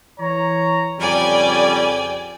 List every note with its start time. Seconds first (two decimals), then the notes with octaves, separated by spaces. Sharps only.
0.20 E3 C#5 A#5
0.99 F2 C#3 G3 D5 G5 G#5